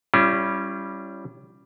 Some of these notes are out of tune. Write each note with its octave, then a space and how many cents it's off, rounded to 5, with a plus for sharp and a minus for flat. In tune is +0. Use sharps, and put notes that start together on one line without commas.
G3 +0 C#4 -5 E4 +45